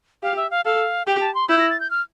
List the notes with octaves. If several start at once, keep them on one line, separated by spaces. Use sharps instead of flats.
G4 F5
E5
F5
A4 F5
G4 G5
A5
C6
E4 G6
A#6
A6
G6
F6